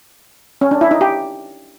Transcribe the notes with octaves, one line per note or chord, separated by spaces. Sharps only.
C#4
D4
E4
D#4
G4